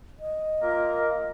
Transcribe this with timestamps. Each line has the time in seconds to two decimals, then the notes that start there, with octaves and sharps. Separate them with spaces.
0.20 D#5
0.62 A#3 F4 A#4